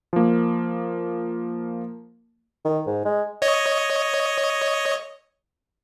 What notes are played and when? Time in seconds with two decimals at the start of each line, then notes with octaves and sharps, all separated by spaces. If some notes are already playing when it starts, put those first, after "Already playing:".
0.13 F3 A#3
2.65 D#3
2.87 G#2
3.05 G#3
3.42 C#5 D#5